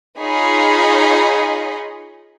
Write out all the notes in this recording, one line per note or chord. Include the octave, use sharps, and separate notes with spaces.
D#4 F4 G#4 C#5 D#5 B5